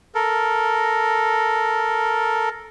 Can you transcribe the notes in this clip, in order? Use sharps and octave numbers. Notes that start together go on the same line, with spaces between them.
A4 A#4